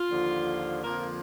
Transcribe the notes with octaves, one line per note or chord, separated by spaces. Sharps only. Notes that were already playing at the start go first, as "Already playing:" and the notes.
Already playing: F4
D#2 D3 F3
F2 D3 F3 A#3 A#4